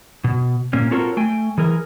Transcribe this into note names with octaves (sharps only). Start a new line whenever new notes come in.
B2
A#2 A#3 C#4
C4 F4 F#4 A4 A#4 C#5
A3 G5 G#5
E3 G#4 A#4